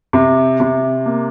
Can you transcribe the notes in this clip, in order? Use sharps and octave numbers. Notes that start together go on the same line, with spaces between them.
C3
C3
A#3